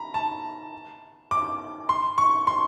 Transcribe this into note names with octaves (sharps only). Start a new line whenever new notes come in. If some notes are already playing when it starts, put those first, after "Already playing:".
Already playing: A#5 B5
A5
D6
C6
C#6
C6